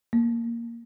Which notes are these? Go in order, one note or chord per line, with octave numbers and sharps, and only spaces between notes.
A#3